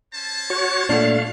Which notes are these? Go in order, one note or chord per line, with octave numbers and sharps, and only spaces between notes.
C#4 C5 A5
F#4 C#5
A#2 A3 D4 F5